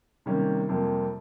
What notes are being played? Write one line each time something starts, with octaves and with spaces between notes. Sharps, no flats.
C3 D#3 G3 A#3 C#4
F2 C3 G3 A#3